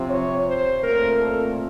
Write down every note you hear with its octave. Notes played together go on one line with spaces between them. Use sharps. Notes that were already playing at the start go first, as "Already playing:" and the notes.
Already playing: C3 F3 C4
C#5
C5
A#2 A3 C4 A#4
A4